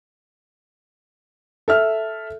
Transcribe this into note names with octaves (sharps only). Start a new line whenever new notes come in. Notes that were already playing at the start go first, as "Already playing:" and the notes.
A4 E5 F6